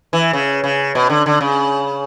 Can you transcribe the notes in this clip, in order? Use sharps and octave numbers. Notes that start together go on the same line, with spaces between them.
E3
C#3
C#3
B2
D3
D3
C#3